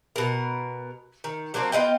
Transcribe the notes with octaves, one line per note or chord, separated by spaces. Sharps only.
B2 A#4
D#3
F#3 A#3 C4 D4
B3 F4 D#5 G5